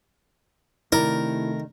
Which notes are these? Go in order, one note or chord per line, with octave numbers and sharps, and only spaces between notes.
C3 D#3 A3 E4 A#4 D5